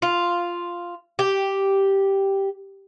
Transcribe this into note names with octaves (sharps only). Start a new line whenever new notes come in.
F4
G4